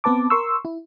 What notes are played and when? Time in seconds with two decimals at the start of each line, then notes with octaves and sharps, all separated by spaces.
0.04 B3 C4 B4 A5 D6
0.30 A#4 C6 C#6 E6
0.65 E4